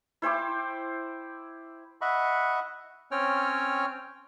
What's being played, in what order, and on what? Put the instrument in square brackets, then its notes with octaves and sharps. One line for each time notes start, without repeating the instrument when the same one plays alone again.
[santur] E4 C5 G5 D6
[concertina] D#5 E5 F#5 B5 C#6
C4 C#4 C#5 G5 F6